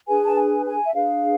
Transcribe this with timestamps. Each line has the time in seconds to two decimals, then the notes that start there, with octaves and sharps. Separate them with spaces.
0.08 D4 G#4 B4 G#5
0.25 A5
0.37 G#5
0.66 G#5
0.85 E5
0.93 D4 G#4 B4 F5